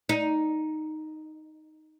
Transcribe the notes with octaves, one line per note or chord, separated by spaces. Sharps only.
D#4